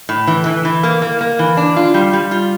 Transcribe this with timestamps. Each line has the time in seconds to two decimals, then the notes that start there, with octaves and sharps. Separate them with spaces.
0.09 A2
0.27 E3
0.46 E3
0.65 E3
0.83 A#3
1.02 A#3
1.21 A#3
1.39 E3
1.57 D4
1.76 F4
1.94 G3
2.13 G3
2.31 F4